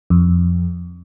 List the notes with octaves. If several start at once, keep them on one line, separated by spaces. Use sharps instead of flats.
F2